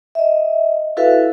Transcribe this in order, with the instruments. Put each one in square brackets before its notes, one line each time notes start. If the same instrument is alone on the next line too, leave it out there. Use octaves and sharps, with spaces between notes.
[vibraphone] D#5 E5
E4 F#4 A4 B4 E5 F5